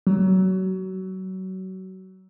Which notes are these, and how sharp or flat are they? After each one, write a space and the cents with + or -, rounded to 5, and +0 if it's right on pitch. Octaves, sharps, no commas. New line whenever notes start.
F#3 +25